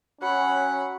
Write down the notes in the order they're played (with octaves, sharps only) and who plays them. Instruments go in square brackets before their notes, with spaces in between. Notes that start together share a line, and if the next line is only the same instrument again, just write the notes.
[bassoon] F#3 [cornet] C#4 [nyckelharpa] F#5 B5